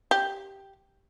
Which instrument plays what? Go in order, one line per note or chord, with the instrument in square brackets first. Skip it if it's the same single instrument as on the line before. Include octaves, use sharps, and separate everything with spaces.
[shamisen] G4